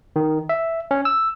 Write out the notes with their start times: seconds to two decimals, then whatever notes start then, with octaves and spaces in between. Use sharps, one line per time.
0.16 D#3
0.49 E5
0.91 C#4
1.05 E6